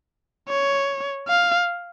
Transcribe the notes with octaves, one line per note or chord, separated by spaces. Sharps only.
C#5
F5